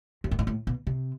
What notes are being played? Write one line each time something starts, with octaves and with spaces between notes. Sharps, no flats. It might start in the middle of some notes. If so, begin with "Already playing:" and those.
F#2
G2
G#2
A2
B2
C3